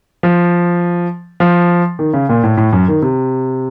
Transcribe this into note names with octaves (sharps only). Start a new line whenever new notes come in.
F3
F3
D#3
C#3
A#2
A2
A2
F#2
D#3
C3